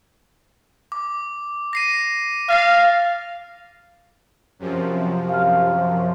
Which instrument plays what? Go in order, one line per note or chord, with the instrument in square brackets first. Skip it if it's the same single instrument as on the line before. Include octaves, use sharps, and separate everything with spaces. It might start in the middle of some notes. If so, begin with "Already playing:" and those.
[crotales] D6
A#6 C7 D#7
[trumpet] F5 [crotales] F6 A6 C7
[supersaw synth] F#2 C3 F3
[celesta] F5 F6